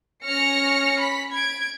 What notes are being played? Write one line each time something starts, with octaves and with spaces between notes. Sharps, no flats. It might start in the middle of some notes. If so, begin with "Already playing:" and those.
C#4 C#5 F6 A#6 C#7
B5 B6
G#6 D7